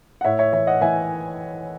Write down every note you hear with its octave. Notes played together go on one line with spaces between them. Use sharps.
F#5
A2 C#5 E5
C#5 E5
E3 C#5 E5
D#5 F#5
E3 E5 G#5